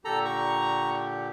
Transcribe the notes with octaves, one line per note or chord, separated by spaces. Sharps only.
A#2 D3 G4 A4 A#5
A#5 C#6